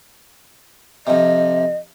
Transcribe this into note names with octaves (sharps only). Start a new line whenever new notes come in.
F2 C3 D#5